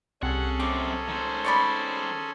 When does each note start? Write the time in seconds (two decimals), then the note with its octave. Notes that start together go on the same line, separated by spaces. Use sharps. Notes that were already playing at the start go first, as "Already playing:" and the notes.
0.23 C2 C#4 G#4 A4 F#5
0.60 F#2 C4 D6
1.09 D#3 C5
1.45 C#5 D5 B5